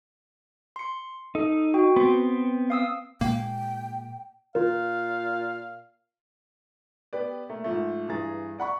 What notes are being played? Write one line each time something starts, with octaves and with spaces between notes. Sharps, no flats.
C6 C#7
D#4 A4
F#4 G5
B3 C4 C6
F5 D#6 E6
A#2 G#3 A#3 G5
A#2 F4 A#4 F5
B3 G4 B4 D5
A3 A#3
G#2 F3 A3
G2 E3 G#4 A#5 A6
D5 F#5 B5 C#6